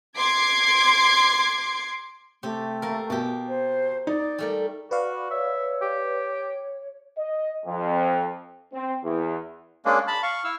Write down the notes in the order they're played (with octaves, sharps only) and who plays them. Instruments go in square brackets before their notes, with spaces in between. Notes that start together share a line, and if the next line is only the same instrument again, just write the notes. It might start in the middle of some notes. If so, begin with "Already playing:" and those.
[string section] C6 D6 G#6 C7
[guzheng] C3 G4 [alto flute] A3
[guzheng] A#3 A#4
[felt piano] B2 [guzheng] A#3 G4
[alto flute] C5
[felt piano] D#4 [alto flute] D5
[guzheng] G3 A3 A#4
[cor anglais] F#4 [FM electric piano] B4 D5 F5
[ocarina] C#5 [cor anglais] E5
[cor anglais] G4
[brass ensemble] D#5
F2
C4
E2
[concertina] G#3 A#3 C#4 D4
A5 B5
F5 C#6
E4 E6 F6